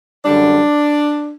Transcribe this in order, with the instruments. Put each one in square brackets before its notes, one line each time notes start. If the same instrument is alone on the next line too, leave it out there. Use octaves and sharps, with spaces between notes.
[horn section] F#2 D3 G3 D4